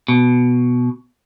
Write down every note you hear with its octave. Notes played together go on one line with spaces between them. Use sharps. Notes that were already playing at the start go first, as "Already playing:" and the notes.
B2